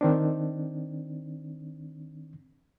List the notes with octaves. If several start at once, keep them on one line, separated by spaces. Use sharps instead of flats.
D#3 C4 D4